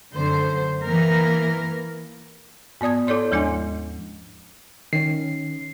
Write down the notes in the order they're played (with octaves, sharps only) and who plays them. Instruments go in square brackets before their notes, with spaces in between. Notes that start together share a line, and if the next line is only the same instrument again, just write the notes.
[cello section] F#2 D3 C5
E3 A#3 A#4
[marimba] G#2 B3 D5 D#6 G#6
E4 A4 C#5 D5 C6
D#2 F3 G#3 D4 E4 G#5
[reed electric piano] D#3 C#4 [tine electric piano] C7